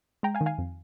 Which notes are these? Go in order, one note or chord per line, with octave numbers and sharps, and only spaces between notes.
G#3 G5 A#5
F5 G#5
D#3
F5 G#5
F2